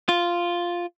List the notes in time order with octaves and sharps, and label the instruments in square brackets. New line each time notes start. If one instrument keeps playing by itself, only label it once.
[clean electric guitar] F4